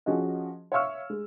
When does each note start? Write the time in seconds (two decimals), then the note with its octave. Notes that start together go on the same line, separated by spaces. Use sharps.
0.06 F3 C#4 F#4 G#4 D#5
0.72 C#5 E5 F5 C#6 E6 F6
1.10 G#3